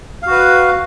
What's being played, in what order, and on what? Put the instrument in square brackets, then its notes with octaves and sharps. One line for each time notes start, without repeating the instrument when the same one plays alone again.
[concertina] F5
F#4
B4